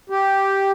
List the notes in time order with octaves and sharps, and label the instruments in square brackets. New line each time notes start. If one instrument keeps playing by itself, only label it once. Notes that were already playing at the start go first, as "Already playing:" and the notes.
[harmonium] G4